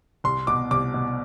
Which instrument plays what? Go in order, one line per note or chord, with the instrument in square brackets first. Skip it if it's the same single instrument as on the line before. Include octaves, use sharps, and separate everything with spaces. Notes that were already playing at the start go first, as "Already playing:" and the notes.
[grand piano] C2 C6
B2 D6
C2 D6
B2